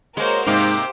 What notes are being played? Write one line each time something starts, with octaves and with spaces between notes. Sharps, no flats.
G#3 A#3 F#4 A#4 C5 C#5
G#2 C3 A#3 D#4 G4 C5 F5